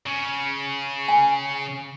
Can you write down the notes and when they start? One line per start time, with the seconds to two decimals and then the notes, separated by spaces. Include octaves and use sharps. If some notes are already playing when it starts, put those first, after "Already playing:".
0.06 C#3
1.08 G#5